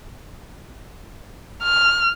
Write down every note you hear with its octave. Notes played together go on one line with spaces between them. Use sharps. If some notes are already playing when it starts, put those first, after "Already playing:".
F6